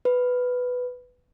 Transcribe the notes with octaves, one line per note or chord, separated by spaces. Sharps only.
B4